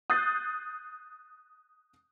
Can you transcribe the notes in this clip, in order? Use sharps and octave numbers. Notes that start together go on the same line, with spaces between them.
D#6 F#6 G6 A6 C7